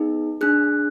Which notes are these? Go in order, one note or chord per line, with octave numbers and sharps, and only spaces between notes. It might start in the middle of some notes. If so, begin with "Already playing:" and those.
Already playing: B3 D#4 G#4
D4 G#4 F#6